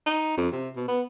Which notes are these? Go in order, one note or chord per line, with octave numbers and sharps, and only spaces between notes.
D#4
F2
C3
B2
B3